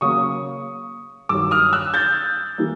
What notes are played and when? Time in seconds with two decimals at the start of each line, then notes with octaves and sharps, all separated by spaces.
0.01 C#3 F#3 A#3 C#6 D#6
1.29 G2 D#3 F#3 D6 E6
1.51 D#6 F6
1.73 E6 F#6
1.94 G6 A6
2.58 E3 G3 A#3